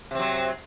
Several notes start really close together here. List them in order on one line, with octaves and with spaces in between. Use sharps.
C3 C4 F#3